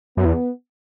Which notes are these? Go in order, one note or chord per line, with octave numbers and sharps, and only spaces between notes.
F#2 B3
E2